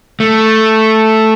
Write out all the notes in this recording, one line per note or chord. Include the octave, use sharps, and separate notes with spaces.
A3